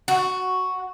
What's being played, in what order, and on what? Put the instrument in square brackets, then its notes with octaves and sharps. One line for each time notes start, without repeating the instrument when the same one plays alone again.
[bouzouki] F#4